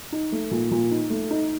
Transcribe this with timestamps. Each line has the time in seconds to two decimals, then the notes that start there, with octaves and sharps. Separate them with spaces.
0.12 D#4
0.32 A3
0.51 A#2
0.71 A#2
0.91 D#4
1.10 A3
1.31 D#4